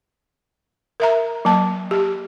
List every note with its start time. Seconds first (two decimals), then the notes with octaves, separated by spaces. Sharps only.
1.00 A#4 E5 A#5
1.45 F#3 A#3 A5
1.91 G4